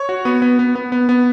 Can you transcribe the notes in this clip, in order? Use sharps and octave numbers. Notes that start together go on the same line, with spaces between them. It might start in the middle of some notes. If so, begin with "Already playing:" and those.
Already playing: C#5
F#4
B3
B3
B3
B3
B3
B3